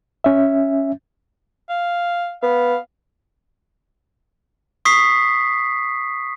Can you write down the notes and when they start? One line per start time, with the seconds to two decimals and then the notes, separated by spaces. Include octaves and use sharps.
0.24 C#4 E5
1.70 F5
2.42 B3 F5
4.85 C#6 D#6 B6 C7